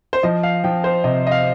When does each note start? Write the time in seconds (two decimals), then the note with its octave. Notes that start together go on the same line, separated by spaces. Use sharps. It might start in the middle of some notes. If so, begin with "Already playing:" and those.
0.13 C5
0.23 F3 D#5
0.43 F5
0.64 F3 G5
0.84 C5
1.04 C3 D#5
1.27 D#5
1.31 F5